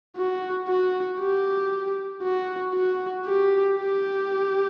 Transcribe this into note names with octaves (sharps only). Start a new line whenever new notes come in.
F#4
F#4
G4
F#4
F#4
G4
G4